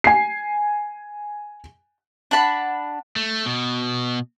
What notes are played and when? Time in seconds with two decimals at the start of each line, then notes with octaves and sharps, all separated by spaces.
0.04 G#5 C7
2.31 D4 F#5 A5 B5
3.16 A3
3.46 B2